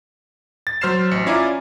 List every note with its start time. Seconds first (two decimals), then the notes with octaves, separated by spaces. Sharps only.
0.67 A6
0.81 F#3 C5 F6 A6 C7 E7
1.11 A1 C#7
1.26 C#4 E4 F4 D5 G#5 A#5